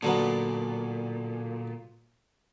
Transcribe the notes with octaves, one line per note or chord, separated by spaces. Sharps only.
A#2 D3 F#3 B3